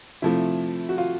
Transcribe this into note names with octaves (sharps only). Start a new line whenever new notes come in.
C3 F3 A3 E4
F#4
F4